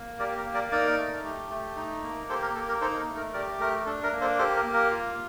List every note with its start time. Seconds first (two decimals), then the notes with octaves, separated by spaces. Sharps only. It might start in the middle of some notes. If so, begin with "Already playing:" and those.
Already playing: A#3
0.19 G4 A#4 D5
0.37 A#4
0.46 A#3
0.54 A#4 D5
0.71 D#4 A#4 D5
0.98 A3
1.24 G4
1.50 A3
1.76 D#4
2.03 A#3
2.29 G4 A4 C5
2.42 A#4
2.55 A#3 A4
2.69 A#4
2.81 D#4 A4 C5
2.99 A#4
3.08 A3
3.17 A#4
3.33 G4 A#4 D5
3.60 A3 A#4
3.86 D4 A4
4.03 A#4
4.12 A#3
4.21 A4 C5
4.39 G4 A4 C5
4.56 A#4
4.65 A#3
4.74 A#4
4.91 F4